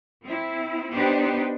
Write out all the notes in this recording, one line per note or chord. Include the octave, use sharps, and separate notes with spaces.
C4 E4
B3 D4 D#4 G4 B4 C5